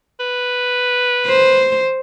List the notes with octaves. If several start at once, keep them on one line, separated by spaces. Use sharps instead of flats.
B4
C5